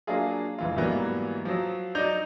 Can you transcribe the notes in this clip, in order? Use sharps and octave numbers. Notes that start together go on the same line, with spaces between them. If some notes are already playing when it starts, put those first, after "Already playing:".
F#3 A#3 D4 F4 G#4
F1 E3 F4
G#2 E3 F#3 G3 A#3 B3
F3 F#3
F#3 D#4 D5 D6 G6 F7